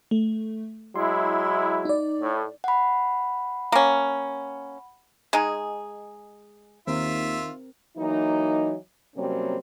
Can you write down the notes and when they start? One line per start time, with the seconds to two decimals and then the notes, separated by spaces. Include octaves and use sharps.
0.11 A3
0.96 F#3 G#3 E4 C6
1.85 D#4 D5
2.21 A2
2.64 F#5 B5
3.72 A#3 C#4
5.33 G#3 D#4 G#4
6.87 D#2 D#3 C4 F4 A#4 E5
7.97 E3 F#3 A#3 D#4
9.16 C3 F#3 G3 A#3 C4 C#4